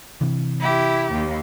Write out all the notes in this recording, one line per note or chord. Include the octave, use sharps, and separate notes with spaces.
C3 E3
E4 G4
D#2